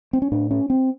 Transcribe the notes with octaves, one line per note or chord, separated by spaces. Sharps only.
C4
C#4
A2 D4
C#4
C4